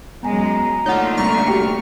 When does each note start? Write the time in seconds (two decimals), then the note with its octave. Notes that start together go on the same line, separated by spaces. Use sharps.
0.23 F#2 G#3 B3 G#5 A#5
0.86 D3 A3 A#3 D#4 F4 C#5 F#5
1.17 C2 G3 A#5 C#6 F6
1.47 F#4 G4 G5 C#7